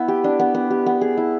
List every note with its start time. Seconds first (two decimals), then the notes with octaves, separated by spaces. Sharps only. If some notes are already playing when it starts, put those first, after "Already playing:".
Already playing: B3 E4 B4 E5
0.08 G4
0.24 D4
0.40 B3
0.55 B3
0.70 G4
0.86 B3
1.01 G#4
1.17 E4